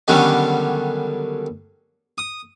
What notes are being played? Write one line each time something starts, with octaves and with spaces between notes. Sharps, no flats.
D3 D#3 F#3 G3 B3 C#4
D#6